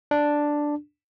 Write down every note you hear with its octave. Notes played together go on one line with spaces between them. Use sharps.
D4